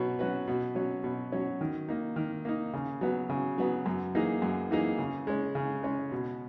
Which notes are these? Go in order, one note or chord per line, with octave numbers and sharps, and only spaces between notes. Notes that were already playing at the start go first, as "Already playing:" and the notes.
Already playing: B2 F#3 C#4 F#4 B4
F#3 C#4 F#4 B4
B2
F#3 C#4
B2
F#3 C#4
D#3
A#3 D#4
D#3
A#3 D#4
C#3
F#3 B3
C#3
F#3 B3
F#2
E3 A#3 D#4 G#4
F#2
E3 A#3 D#4 G#4
C#3
G#3 C#4
C#3
G#3 C#4
B2